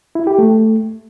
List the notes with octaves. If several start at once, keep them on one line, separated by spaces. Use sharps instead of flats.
E4
G4
A3